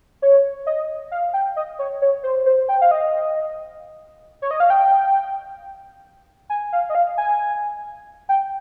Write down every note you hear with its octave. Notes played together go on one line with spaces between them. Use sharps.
C#5
D#5
F5
G5
D#5
C#5
C#5
C5
C5
G5
F5
D#5
C#5
D#5
F5
G5
G#5
F5
D#5
F5
G#5
G5